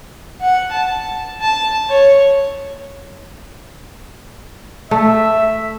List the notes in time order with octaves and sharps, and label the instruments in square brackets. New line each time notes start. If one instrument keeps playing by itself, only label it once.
[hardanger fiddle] F#5
A5
A5
C#5
[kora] A3 [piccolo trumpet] E5